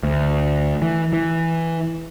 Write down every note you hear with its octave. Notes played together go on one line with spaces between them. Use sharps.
D2
E3
E3